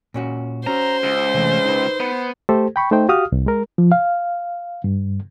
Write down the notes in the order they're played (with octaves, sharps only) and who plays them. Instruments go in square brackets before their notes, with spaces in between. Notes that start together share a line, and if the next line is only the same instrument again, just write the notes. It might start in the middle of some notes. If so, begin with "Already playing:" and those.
[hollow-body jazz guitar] A#2 C#4 F#4
[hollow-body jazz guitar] C#4 F#4 [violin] C5 [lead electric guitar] A#5
[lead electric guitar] C#2
[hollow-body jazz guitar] C3 E3 A3
D#4 B4
[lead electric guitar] B3
[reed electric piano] A3 G4 A4 C5
G5 B5 C#6
A3 D#4 C5 G5
F#4 G4 F5 D#6 F6
C2
G#3 A#4
F3
F5
G2